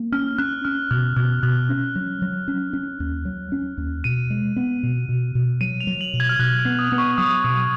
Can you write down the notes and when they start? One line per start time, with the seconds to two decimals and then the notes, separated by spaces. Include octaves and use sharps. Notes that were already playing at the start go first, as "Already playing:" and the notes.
Already playing: A#3
0.12 C#4 F6
0.38 C#4 F#6
0.65 C#4 F6
0.91 B2 F6
1.16 B2 F6
1.43 B2 F#6
1.69 C#4
1.96 F#3
2.22 F#3
2.48 C#4
2.73 C#4
3.00 D#2
3.25 F#3
3.52 C#4
3.78 D#2
4.04 B2 D#7
4.30 G#3
4.56 B3
4.83 B2
5.09 B2
5.35 B2
5.61 F#3 D#7
5.80 F7
5.87 F#3
6.01 F#7
6.14 B2
6.20 G#6
6.29 F6
6.39 B2 F#6
6.59 F6
6.65 B3
6.79 D#6
6.92 B3
6.98 C#6
7.18 F#3 D#6
7.44 B2 D#6